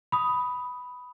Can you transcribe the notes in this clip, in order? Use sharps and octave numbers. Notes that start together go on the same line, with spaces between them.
B5 D#6